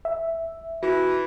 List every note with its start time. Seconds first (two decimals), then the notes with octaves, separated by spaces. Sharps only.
0.05 E5
0.83 E3 F#4